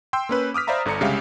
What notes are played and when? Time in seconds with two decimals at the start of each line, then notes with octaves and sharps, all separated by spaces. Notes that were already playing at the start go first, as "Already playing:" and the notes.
0.13 G5 C6 E6 G6
0.29 A#3 C#4 B4
0.54 D6 D#6 F6 B6
0.67 C5 D5 E5 F5 A#5 B5
0.85 G1 D3 D4 A#5 C#7
1.01 C2 C#3 G#3 G4 E5 F5